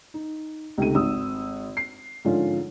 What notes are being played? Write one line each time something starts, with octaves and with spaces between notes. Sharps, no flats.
D#4
C#2 C3 D#3 A3 D#7
G#1 D#6 E6
C7
G#2 D3 F3 C#4 F4